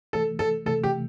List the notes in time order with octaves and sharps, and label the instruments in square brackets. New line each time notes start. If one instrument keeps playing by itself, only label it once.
[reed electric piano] C3 E3 A3 [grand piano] A4
[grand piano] A4
[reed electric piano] C3 E3 A3 [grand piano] A4
[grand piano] G4